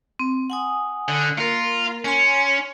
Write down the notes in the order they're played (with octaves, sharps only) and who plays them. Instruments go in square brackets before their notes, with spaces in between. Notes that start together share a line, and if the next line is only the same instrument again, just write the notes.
[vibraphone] C4
F#5 G#5 D#6
[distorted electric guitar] D3
[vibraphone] A#3 A#4 [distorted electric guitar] F4
[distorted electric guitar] C#4 [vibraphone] G#5 C6